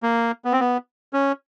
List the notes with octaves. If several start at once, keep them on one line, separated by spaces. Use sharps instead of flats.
A#3
B3
C4
B3
C#4